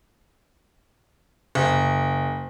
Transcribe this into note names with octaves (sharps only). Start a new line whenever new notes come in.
F#1